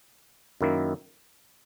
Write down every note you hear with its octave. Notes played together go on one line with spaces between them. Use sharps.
F#2 D#3 A#3 E4